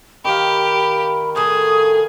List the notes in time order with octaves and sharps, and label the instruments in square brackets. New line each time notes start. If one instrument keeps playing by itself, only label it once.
[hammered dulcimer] D#3 F5 [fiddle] G4 [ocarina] B5
[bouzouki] A2 A4 [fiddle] G#4 [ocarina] D#6